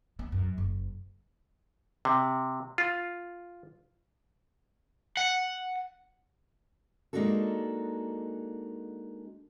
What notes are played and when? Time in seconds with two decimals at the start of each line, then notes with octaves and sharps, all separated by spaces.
0.19 B3
0.32 F#2
0.58 F#1
2.05 C3
2.78 F4
5.17 F#5
7.13 G#3 A#3 D4 D#4 F#4 A4